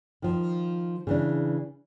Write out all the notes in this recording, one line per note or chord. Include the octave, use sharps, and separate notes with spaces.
D#3 F3
C#3 E3 D4